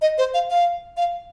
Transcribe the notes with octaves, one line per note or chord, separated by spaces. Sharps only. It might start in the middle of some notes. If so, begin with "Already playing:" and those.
D#5
C5
F5
F5
F5